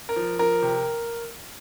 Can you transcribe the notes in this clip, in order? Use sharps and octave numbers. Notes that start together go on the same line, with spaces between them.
A#4
F3
F3 A#4
C3